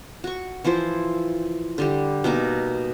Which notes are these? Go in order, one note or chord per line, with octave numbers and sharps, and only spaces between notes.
F#4 C#6
E3 F3 E4 C5
D3 G3 G4
B2 A#3 D#4 D6